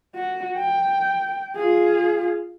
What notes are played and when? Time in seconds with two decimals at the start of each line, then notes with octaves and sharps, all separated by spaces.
0.15 F#4
0.58 G5
1.55 F4 G#4